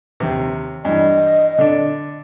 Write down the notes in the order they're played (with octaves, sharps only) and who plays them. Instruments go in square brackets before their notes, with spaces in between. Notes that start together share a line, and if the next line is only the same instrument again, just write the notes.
[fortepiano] D#2 C3
[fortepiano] G2 E3 [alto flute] D#5
[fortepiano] D3 D4